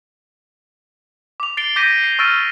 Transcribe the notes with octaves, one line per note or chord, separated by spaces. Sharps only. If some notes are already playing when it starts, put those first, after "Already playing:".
D6 F7
A6 C7 D7 G7
D6 G6 A#6 B6 D7 D#7
C7
C#6 E6 F6 A6 D7 D#7